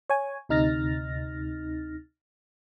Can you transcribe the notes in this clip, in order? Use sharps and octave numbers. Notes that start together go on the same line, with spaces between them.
C#5 G#5
D2 C3 D#4 F6 A6 A#6